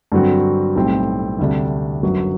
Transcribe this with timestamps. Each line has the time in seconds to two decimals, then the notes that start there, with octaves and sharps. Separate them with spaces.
0.12 G2 D3 F#3 C4 F#4
0.75 B1 A2 G3 C4
1.39 D2 C3 G3 D4 G4
2.03 G1 F#2 F#3